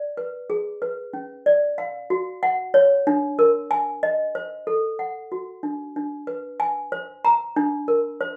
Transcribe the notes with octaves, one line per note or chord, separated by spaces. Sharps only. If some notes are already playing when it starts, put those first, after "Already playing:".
Already playing: D5
B4
G#4
B4
C#4
D5
F5
F#4
F#5
C#5
D4
A#4
G#5
D#5
C5
A4
F#5
F#4
D4
D4
B4
G#5
C5
A#5
D4
A#4
C5